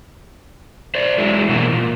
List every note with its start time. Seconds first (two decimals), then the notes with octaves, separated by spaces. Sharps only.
0.95 C5 D5
1.18 F#3 G#3 E4
1.49 B2 D3 E3 F#3 A#3
1.72 A#2